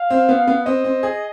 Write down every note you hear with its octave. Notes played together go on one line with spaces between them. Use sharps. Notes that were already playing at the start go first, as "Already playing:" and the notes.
Already playing: F5
C4
B3
B3
C4 D#5
C4
G#4